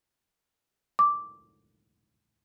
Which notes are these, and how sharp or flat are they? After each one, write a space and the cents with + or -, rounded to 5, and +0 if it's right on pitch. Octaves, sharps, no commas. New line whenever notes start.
D6 -5